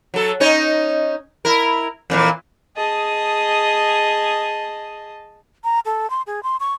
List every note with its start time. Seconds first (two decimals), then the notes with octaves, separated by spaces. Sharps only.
0.14 F#3 A4
0.40 C#4 D#4 C#5
1.45 E4 A#4
2.10 F2 A#2 E3
2.75 G#4 D#5 A5
5.64 A#5
5.85 A4
6.10 C6
6.27 G#4
6.43 C6
6.60 C#6